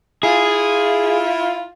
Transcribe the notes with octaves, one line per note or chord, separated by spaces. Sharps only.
E4 F4 G#4